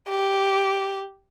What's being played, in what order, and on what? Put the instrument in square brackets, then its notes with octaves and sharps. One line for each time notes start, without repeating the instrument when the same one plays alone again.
[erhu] G4